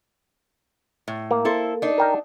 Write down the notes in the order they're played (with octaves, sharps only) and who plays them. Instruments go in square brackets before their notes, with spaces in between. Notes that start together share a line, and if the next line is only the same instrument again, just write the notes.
[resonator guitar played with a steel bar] A2
[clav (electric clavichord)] A#3
[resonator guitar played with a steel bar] E4 A4 C5
D4 D#4
[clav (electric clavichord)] A#4 G5 A#5